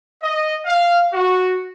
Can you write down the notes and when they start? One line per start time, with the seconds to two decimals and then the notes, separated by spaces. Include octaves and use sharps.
0.23 D#5
0.66 F5
1.13 F#4